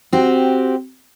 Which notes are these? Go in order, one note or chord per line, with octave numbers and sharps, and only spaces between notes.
C4 F#4 G4